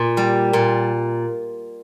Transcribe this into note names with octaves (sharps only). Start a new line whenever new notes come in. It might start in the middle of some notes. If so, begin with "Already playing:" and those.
Already playing: A#2
G3
A#2